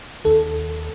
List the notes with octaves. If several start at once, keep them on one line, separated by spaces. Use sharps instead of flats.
D#2 D#3 A4